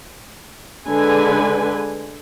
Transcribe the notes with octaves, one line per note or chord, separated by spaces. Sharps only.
D3 G#3 B4 G#5